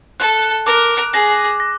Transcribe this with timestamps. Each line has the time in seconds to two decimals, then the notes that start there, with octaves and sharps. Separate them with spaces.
0.19 A4 F#6
0.66 A#4 D6
1.13 G#4 A#6
1.60 A#6